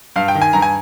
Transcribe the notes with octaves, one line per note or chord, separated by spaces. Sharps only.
G2 F5
G5
D#3
G#5
G2 A#5
G#5